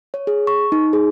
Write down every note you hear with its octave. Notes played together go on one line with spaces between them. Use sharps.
C#5
G#4
C#6
D#4
G#4